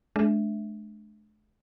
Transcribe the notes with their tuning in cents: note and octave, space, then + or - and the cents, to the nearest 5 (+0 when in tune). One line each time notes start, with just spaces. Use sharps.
G#3 +45 D4 +0 E5 +5